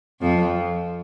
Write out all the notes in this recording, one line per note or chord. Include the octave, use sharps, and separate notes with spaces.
F2 F3